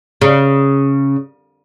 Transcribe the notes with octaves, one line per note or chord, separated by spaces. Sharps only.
C#3